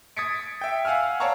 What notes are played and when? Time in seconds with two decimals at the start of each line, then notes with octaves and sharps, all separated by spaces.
0.17 D#6 G#6 A6 B6 C#7 D7
0.61 E5 G5
0.85 F5 F#5 G#5 E6 F6
1.20 C#5 D5 F5 A5 A#5 C#6